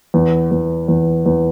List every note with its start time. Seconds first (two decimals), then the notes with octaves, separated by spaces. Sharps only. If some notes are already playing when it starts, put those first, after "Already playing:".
0.14 E2
0.51 E2
0.88 E2
1.26 E2